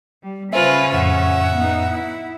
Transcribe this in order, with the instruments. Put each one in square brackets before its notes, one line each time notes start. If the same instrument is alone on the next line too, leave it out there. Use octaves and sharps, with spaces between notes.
[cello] G3
[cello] C#3 C#4 [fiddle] F4 B4 [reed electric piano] C5 E5 [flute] G#5
[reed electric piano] F2 A2 [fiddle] E5 [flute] F#5
[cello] B3 D#4
E4